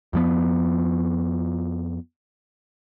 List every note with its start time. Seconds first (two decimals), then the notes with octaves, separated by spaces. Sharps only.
0.13 F2 F3 B3